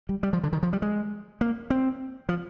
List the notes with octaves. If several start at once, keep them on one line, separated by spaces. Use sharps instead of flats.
G3
G3
F3
D3
D#3
F3
G3
G#3
A#3
C4
F3